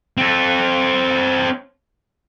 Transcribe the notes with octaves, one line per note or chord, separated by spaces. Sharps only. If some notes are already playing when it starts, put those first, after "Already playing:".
C4 A4